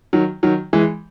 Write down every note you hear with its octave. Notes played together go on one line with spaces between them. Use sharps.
D#3 F#3
D#3 F#3
E3 G#3